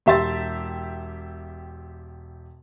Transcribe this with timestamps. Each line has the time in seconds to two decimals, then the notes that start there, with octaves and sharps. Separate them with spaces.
0.06 E1 G4 E5 C6 A6